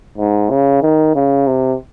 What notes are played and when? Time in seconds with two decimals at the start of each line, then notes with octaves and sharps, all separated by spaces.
0.17 G#2
0.50 C#3
0.82 D#3
1.15 C#3
1.47 C3